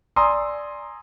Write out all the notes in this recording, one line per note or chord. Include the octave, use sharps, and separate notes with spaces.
D5 G#5 A#5 C6 D#6 E6